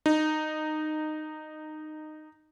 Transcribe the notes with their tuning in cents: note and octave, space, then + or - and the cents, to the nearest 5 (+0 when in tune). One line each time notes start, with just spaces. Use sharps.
D#4 -15